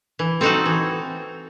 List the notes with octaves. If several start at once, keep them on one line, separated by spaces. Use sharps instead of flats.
E3
C4 D#4 F#4 A4
E3